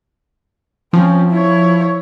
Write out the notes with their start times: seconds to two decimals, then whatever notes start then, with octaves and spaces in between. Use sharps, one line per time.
0.93 F3 C4 C#4
1.30 E4 C#5